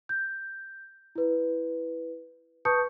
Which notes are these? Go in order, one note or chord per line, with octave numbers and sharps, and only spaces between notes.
G6
E4 B4
B4 A5 C#6 D#6 G6 C#7